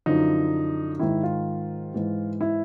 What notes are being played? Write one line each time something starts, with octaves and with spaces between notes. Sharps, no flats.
F#2 D3 F3 D#4
G#2 D#3 E4
F4
G#2 E3
E4